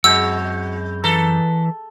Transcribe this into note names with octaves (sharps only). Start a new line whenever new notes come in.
F#2 G#3 C4 E4 F#4 E6
E3 A4 B4 A#5